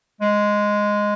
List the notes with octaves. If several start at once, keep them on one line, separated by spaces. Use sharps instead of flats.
G#3